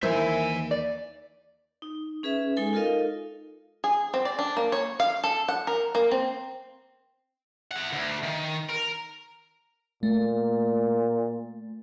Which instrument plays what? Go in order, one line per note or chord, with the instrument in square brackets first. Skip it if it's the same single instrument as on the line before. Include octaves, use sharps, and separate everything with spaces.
[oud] D#2 A#3 E4 [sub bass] E3 [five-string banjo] C5 [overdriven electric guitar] E5 G#5
[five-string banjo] D5
[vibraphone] D#4
C#4 G#4 B4 E5
G#3 D#4 A4 G#5
D#4 F4 A4 A#4 D#5 F5
[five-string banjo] G#4
C4
D5
D4
A#3
C#5
F5
A4
F#5
A#4
A#3
C4
[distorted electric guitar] E4 F#5
D2
D#3
A#4
[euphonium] A#2 [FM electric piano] A3